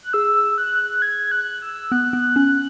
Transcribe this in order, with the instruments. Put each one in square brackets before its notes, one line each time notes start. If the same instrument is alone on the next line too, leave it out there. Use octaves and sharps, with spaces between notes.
[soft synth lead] F#6
[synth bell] G#4 [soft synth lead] E6
[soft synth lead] F#6
F#6
G#6
F#6
E6
[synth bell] B3 [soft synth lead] F#6
[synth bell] B3
C#4